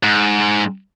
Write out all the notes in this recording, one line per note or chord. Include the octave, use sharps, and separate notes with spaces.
G#2